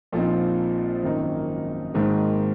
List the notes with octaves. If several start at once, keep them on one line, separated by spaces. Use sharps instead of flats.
A#1 A#2 F3 C4 D#4
G#1 F#2 D#3 A#3 D#4
G#1 G#2 D#3 A#3